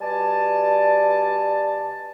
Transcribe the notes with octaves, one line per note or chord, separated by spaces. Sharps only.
B2 G3 D5 G#5 A5